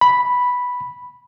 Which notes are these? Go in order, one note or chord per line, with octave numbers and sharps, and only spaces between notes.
B5